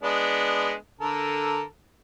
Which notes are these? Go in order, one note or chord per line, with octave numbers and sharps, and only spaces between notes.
G#3 B3 D4
D3 A4 A#4